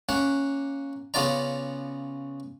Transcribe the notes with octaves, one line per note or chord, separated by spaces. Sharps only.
A#3 C#4 F#5
C#3 B3 C#4 F4 D5 A#5